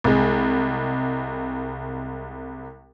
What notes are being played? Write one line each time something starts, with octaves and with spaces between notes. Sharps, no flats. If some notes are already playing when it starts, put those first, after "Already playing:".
C2 G#3